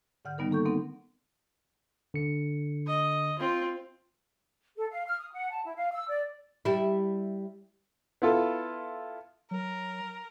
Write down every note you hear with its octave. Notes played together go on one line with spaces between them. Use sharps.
G#2 D3 F#5 F6 G6
D#3 G3 B3 D#4 A#4
A#3 A4 C#6 G6
B3 C4 D#4 A4 A#4 F#5
D3 C#7
D#5
C4 F4
A4
F5
F6
D#6
F#5
A5
E4
F5
E6
D5
G3 E4
B3 E4 F4 A4
F#3 A#4